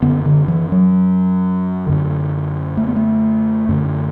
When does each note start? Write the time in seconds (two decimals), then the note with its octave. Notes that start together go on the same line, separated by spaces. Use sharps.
0.02 F#2 D3 B3
0.26 D3
0.48 E3
0.72 F#3
1.87 F#2 D3
2.77 A3
2.87 B3
2.96 A3
3.69 F#2 D3